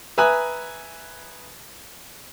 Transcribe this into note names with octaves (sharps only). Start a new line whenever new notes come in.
B4 E5 G#5 A#5 D#6 F#6